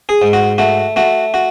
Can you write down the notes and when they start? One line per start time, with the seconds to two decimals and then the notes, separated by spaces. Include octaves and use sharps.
0.09 G#4
0.22 G#2
0.33 F#4
0.58 A3 F#4
0.96 A3 F#4
1.34 F#4